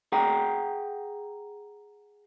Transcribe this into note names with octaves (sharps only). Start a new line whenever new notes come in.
G#4 F#5 G5 A#5